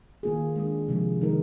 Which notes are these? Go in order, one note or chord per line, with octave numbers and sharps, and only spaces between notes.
D#3 A#3 F4 G#4
G#3 D4 G#4
C3 F3 G#3
D#3 G#3 D#4 A#4